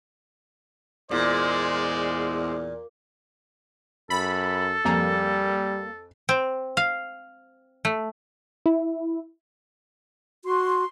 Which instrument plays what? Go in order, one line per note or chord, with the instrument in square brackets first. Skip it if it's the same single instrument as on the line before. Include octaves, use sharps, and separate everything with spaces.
[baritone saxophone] E2 [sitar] A#2 [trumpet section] G#3 C5 D5
[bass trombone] F#2 [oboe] A4 [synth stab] B5
[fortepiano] F2 G#5 A#5 [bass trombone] G3 [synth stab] A#3
[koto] C4
F5
A3
[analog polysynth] E4
[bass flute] F#4 [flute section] C6